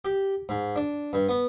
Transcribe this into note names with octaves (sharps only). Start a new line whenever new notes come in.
G4
G#2
D4
G2
B3